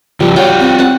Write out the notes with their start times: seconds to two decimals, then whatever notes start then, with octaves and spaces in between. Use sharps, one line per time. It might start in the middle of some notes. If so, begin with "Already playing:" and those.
0.20 C#2 F3 G3 F4
0.36 F4 F#4 C#5 G5
0.60 C4
0.79 C4 F#5 A5